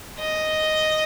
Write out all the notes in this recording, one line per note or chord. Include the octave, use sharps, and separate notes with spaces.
D#5